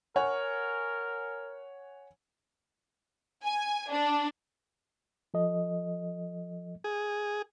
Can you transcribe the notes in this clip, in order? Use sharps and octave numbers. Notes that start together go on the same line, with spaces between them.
A#4 C#5 F#5 G#5
G#5
D4
F3 A4 D#5
G#4